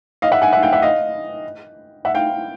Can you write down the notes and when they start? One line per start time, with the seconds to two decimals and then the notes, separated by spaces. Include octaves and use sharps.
0.22 D#5 F5
0.32 E5 F#5
0.42 F#5 G#5
0.53 E5 F#5
0.63 F5 G5
0.73 E5 F#5
0.82 D#5 F5
2.05 E5 F#5
2.14 F5 G5